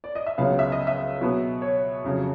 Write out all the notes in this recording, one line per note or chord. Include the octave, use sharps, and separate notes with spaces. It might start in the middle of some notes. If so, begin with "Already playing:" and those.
D5
D#5
E5
C#2 C#3 F#3 B3 F5
E5
D#5
E5
B2 F#3 B3
C#5
F2 C#3 F#3